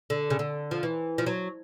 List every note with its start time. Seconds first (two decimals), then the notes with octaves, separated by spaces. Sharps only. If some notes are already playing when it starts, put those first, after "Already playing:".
0.10 D3
0.30 C#3
0.39 D3
0.71 F3
0.83 E3
1.18 F3
1.26 F#3